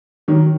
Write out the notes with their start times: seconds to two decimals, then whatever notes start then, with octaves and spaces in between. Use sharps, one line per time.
0.28 D#3 F#3